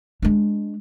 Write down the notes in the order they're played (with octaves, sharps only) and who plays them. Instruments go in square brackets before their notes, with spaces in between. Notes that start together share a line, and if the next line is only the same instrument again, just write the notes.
[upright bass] G#3 D4